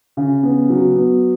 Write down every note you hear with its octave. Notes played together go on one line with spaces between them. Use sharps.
C#3
B3
F#3
B3